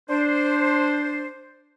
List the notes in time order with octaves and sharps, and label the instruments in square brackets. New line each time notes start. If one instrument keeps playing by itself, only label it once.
[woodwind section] D4 C5